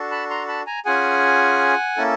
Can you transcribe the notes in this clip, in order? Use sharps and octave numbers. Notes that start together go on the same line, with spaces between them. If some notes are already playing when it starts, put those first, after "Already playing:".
Already playing: D4 F#4 A4
A5 B5
A#5 C6
A5 B5
G#5 A#5
C#4 F4 G#4 F#5 G#5
A#3 C#4 E4 A4